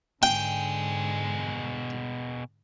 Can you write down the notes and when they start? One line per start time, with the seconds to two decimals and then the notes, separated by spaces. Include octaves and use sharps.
0.23 G#2 B2 D3 G#4 G5